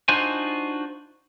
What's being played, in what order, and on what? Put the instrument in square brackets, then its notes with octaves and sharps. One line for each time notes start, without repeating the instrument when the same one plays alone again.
[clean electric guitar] D4 D#4 F4 F#4 C5 G#5